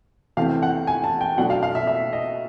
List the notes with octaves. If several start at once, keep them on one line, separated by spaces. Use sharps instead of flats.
E2 C3 E3 A3 C4 F5
F#5
G#5
A5
G5
B2 F#3 A3 D4 F#5
F5
F5
E5
E5
D#5